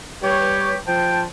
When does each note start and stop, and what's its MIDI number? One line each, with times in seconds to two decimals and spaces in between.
0.23 0.77 55
0.23 0.76 67
0.23 0.77 71
0.23 0.77 73
0.87 1.25 53
0.87 1.25 72
0.87 1.20 79
0.87 1.25 81